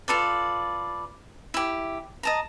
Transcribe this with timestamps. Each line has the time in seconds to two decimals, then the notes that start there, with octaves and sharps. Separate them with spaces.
0.08 F4 A4 B4 D5
1.54 E4 G4
2.23 D#5 A5 A#5